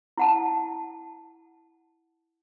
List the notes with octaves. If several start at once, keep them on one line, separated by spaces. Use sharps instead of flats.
E4 F#5 A5